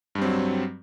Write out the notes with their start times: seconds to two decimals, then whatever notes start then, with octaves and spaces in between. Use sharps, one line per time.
0.15 G2
0.18 G3
0.22 C4
0.25 F#3